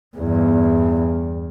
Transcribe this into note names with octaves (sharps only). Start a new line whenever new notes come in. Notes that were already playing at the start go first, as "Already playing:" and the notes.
E2 G2